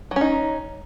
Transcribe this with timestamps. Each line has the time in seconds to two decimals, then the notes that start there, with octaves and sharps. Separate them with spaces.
0.11 F#3
0.16 C#4
0.21 D#4